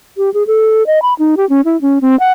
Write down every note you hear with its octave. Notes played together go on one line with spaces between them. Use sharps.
G4
G#4
A4
D#5
B5
D#4
G4
C#4
E4
C#4
C4
F#5